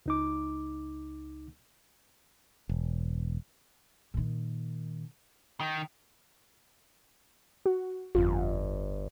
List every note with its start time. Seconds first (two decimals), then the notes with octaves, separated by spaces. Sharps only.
0.06 C#2 D#4 D6
2.69 E1
4.14 A#2 D#3
5.60 D#3
7.66 F#4
8.15 G1 F2 F4